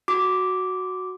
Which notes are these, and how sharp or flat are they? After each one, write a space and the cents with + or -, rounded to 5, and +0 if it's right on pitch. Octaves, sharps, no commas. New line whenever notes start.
F#4 +0 D6 -5